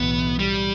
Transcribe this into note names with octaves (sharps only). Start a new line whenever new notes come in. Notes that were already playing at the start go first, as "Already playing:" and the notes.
Already playing: B1 A2 E3 B3
G3